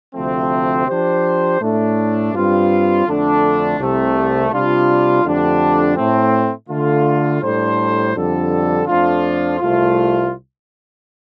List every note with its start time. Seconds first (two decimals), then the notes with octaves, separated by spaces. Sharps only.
0.15 D2 C3 F3 A3 C4
0.87 F3 D4 G4 C5
1.60 A2 A3 D4
2.33 G2 G3 C4 F4
3.05 F2 D3 A3 D4 A4
3.79 C2 C3 A3
4.51 C3 G3 D4 F4
5.23 F2 D3 A3 D4 G4
5.96 A2 A3 C4
6.68 D3 A3 F4
7.42 A2 G3 D4 A4 C5
8.15 F2 D3 G3 D4 A4
8.87 F2 F3 A3 D4 F4
9.60 C2 C3 A3 F4